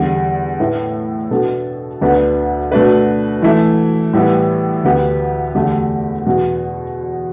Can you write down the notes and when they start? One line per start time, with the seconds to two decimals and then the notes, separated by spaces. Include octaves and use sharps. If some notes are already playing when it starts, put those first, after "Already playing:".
Already playing: E2 D3 G3
0.60 A2 A3 E4 B4
1.31 B2 B3 D4 A4
2.01 D2 D3 B3 D4 B4
2.72 B2 A3 D4 B4
3.42 E3 A3 E4
4.13 A2 E3 G3 B3
4.84 D2 D3 B3 G4
5.55 E2 D3 A3 G4
6.26 E2 B2 B3